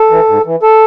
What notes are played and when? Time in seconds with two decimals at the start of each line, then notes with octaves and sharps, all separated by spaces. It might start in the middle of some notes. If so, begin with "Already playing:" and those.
Already playing: A4
0.10 E3
0.29 G#2
0.46 E3
0.62 A4